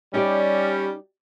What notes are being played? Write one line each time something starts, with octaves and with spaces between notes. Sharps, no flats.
G3 C#4 D#4 G4 D5